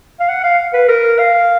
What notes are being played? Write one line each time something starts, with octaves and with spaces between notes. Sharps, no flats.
F5
F#5
F5
B4
A#4
F5